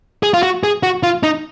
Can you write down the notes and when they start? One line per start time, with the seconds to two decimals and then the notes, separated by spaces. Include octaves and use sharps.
0.23 G#4
0.34 F4
0.43 F#4
0.63 G#4
0.83 F#4
1.03 F4
1.23 D#4